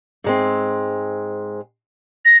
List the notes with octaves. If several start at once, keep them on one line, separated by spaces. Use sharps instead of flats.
G#2 G#3 C4
A#6